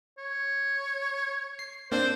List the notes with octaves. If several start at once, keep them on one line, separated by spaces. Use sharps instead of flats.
C#5
C7
A#3 C4 D4 C5